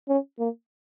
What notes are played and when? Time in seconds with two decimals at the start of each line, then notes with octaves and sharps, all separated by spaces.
0.08 C#4
0.39 A#3